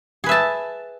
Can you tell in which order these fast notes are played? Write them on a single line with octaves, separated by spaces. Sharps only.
G#4 B4 E5 A5